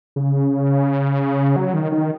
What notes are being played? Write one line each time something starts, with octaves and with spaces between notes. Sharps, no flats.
C#3
F#3
D#3
D#3